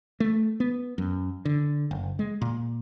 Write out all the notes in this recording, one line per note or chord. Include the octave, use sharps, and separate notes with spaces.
A3
B3
F#2
D3
F#1
G#3
A#2